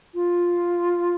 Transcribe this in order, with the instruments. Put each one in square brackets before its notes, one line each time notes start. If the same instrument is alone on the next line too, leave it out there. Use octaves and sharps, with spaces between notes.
[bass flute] F4